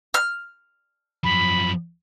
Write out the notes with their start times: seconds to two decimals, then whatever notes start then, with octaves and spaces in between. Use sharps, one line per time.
0.14 F6
1.23 F#2 F3 B5